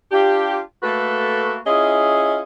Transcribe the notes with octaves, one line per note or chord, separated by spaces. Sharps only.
D4 F4 G4
A3 A#3 F#4 A4 B4
C#4 E4 F4 G#4 D#5